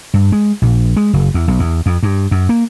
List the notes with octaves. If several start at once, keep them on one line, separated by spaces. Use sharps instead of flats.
G2
G#3
A#1
G#3
F#1
E2
B1
E2
F2
G2
F#2
A#3